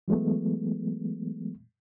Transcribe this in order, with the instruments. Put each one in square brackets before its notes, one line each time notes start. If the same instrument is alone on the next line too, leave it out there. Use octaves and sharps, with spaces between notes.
[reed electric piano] E3 F#3 G#3 A3 B3